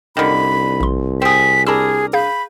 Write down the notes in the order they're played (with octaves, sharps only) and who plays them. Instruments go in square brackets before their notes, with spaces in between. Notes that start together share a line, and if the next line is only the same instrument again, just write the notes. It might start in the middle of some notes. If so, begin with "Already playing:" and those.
[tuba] C2 [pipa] D3 D#3 [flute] B5
[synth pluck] A#1 C6
[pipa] C4 G#4 [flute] B6
[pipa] D4 A#4 [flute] G#4 [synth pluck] A5 B5 E6
[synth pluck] G#4 F5 G6 [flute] B5